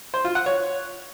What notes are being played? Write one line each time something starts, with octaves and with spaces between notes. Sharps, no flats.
C5
F4
F#5
C#5